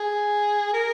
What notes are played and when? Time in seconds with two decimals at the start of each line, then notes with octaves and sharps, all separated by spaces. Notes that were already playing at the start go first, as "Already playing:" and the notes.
Already playing: G#4
0.74 A#4